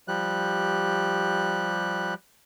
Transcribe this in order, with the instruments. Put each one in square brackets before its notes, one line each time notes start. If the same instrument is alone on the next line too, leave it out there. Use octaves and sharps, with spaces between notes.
[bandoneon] F3 G3 G4 F#6